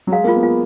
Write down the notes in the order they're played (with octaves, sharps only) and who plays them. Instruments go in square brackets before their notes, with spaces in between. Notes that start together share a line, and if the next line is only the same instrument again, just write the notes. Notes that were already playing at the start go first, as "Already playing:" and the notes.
[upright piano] F#3
[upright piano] G#3 [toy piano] F5
[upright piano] A#3 [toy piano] F4
[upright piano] B3
[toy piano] F4